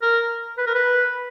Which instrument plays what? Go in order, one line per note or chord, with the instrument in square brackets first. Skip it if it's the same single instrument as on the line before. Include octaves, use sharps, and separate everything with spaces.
[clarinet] A#4
B4
A#4
B4